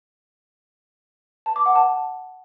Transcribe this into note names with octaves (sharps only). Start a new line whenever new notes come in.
A5
D6
F#5
A5